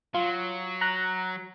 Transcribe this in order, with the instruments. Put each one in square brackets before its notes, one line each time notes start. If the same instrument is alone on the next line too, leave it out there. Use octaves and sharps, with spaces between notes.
[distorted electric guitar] F#3 [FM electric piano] F4
[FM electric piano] A#5 F#6